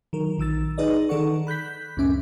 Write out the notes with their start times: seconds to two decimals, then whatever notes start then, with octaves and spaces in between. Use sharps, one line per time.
0.13 D#3 F#3 A#4
0.38 A#1 D#3 E6 A6
0.78 D#4 G#4 B4 D5 D#5
1.09 D#3 A4 D5 F#5 C#6
1.47 B5 F#6 G6 B6
1.97 C#2 F#2 A2 C#4 E5 D6